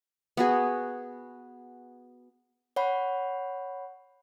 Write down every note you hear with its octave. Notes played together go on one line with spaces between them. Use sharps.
B3 F#4 G#4
C#5 F#5 B5